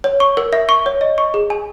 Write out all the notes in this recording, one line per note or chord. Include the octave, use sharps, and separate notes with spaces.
C#5
C#6
A#4
E5
C#6
C#5
D#5
C#6
G#4
G#5